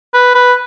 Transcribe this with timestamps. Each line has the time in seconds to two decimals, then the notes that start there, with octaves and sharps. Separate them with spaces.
0.14 B4
0.34 B4